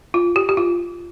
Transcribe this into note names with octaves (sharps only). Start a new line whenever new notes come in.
F4
G4
G4
F4